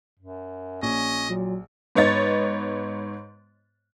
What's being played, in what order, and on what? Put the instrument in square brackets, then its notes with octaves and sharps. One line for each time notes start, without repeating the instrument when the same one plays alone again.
[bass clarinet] F#2
[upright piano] A#1 [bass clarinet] C#4 [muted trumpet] D#5
[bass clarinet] A#2 [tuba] F#3
[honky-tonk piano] G#2 B3 C#5 D#5 A6